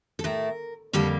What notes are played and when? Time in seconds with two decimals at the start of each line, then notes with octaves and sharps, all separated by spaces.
0.19 A4
0.24 A2 A3 A#4
0.93 F2 D3 G3 A#3 A4